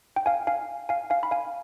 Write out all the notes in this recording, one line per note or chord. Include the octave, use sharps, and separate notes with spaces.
G5
F5 G#5
F5 G#5
F5 G#5
F5 G#5
B5
F5 G#5